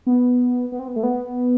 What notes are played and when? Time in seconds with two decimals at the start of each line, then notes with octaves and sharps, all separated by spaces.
0.06 B3
0.72 B3
0.79 C4
0.88 B3
0.96 A3
1.03 B3